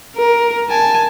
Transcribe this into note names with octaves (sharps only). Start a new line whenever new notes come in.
A#4
G#5 A5